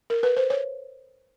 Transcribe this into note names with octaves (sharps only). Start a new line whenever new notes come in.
A#4
B4
C5
C#5